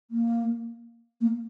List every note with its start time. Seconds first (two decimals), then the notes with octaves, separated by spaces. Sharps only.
0.11 A#3
1.21 A#3